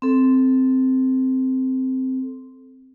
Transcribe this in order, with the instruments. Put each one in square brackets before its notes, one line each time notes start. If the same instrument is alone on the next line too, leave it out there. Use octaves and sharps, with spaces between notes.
[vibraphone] C4 A4